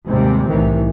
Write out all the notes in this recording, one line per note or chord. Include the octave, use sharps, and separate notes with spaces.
D#2 G#2 C3 G3 C4
C2 A2 D#3 E3